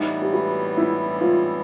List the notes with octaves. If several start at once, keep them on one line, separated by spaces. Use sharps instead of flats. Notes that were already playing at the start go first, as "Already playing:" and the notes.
Already playing: A2 E3 G3 B3 D#4
G4
F#4
E4
F4